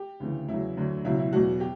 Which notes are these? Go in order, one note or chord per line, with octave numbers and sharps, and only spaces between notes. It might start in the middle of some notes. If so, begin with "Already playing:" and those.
Already playing: G4
D2 C#3 E3
E2 C#3 F#3 E4
D2 D3 F#3
C#2 B2 F#3 E4
E4
E2 B2 F#3 F#4
G4